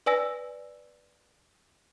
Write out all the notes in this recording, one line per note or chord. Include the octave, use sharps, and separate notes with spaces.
B4 D5 G#5 E6 A#6